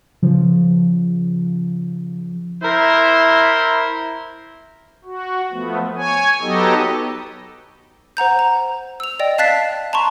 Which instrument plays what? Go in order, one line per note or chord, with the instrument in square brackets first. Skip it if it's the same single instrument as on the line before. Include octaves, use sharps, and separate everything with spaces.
[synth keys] C#3 F3
[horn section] E4 A#4 C5
[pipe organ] F#4
F3 A3 B3
C#5 G#5
F#3 B3 D#4 G4 A4 D#5
[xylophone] C5 F#5 A#5 G6
A#5
E6 F7
D5 D#5 G5
F5 A5 F#6 A6 B6 C7
A5 A#5 C6 C#6